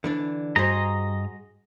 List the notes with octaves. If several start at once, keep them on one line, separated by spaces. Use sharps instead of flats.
D3 E3 D4
G2 F#4 G#4 C5 D#5 A#5